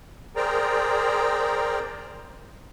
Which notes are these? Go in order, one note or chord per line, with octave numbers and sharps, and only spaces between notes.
G#4 A#4 C5 D5 G5 A#5